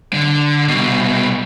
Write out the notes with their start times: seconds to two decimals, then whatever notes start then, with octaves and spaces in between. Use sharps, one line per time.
0.13 D3
0.69 C2 B2